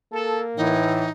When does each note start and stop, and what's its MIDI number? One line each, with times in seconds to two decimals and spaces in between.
0.13 0.76 58
0.13 0.41 69
0.57 1.06 45
0.57 1.08 52
0.57 1.11 63